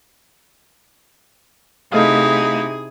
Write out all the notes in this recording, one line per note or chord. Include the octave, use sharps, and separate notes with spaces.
C3 A3 D#4 E4 G#4 D#5 F5